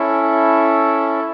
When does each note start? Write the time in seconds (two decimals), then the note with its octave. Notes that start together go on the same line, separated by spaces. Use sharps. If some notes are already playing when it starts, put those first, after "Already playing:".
Already playing: C#4 E4 A4